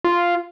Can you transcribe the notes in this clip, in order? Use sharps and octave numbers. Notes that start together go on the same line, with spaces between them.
F4